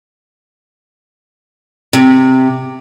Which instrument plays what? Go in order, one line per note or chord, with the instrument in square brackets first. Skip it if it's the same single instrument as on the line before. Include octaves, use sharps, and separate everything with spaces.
[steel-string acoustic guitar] C3